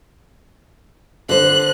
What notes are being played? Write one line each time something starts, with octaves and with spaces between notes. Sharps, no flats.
D3 C5 F#6